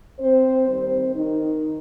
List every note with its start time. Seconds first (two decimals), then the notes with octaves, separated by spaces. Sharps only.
0.19 C4 C5
0.67 D#2 D#3 G3 C4 C5
1.16 D#3 D#4